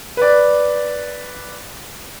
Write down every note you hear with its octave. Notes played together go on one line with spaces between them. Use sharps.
B4 D5